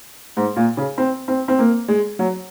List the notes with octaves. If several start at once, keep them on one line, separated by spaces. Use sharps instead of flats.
G#2
A#2
C#3
C4
C4
C4
A#3
G#3
F#3